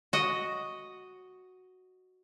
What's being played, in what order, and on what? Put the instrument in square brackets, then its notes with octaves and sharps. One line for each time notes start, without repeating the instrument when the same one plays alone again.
[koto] F#4 D#5